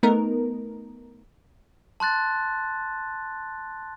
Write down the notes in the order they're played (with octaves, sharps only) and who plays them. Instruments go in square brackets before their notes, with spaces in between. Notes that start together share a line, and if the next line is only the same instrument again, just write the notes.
[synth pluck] A3 B3 D#4 A#4
[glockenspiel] A5 C6 F#6 A6